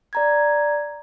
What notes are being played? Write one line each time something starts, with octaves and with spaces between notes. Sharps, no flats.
D5 A#5 G#6